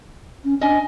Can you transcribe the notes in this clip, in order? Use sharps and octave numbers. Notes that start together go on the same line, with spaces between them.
C#4
D4 D#5 G#5